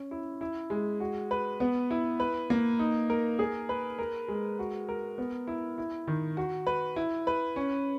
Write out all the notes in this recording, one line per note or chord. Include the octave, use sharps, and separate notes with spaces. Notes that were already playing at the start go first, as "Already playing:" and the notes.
Already playing: C#4
E4
E4
G#3
F#4
B4
B3
E4
B4
A#3
D#4
A#4
G#4
B4
A#4
G#3
F#4
A#4
B3
E4
E4
D#3
F#4
B4
E4
B4
C#4